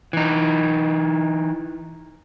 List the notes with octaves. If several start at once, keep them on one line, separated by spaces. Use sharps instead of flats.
E3 D#4